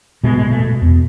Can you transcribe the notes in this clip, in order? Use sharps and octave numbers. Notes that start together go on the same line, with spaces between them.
B2 G#3
G#3
B2
A3
B2
E2